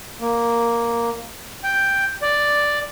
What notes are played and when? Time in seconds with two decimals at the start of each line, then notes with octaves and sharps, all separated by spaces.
0.20 A#3
1.64 G5
2.22 D5